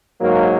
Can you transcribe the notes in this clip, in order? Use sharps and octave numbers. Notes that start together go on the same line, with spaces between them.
G#2 F#3 A#3